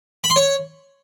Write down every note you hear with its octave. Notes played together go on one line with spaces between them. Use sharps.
B5
C6
C#5